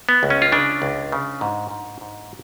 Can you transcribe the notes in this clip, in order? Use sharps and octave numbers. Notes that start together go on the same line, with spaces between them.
B3
C#2
C#4
F4
C#3 D4
C#2
C#3
G#2
G#2
G#2